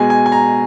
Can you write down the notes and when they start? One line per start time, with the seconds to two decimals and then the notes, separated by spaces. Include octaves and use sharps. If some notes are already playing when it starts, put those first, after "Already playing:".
Already playing: B2 G#3 G#5
0.10 G#5
0.26 G#5
0.32 A#5